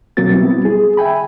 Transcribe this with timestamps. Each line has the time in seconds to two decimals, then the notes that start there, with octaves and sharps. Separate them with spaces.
0.17 B2 F#3 A#3 C4 F#4 A6
0.34 G3 B3 C4 E4
0.65 G#4
0.97 E5 G5 G#5 B5